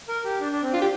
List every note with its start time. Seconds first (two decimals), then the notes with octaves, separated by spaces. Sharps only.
0.08 A#4
0.25 G4
0.40 D4
0.52 D4
0.62 C4
0.73 D4 F4
0.82 G4